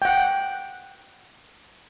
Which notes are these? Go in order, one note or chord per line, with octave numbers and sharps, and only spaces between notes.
F#5 G5